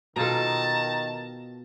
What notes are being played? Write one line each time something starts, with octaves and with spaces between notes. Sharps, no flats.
B2 D#3 F4 A4 A5 A#5